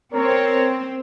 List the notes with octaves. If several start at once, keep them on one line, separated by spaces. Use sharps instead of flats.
C4 A#4 C#5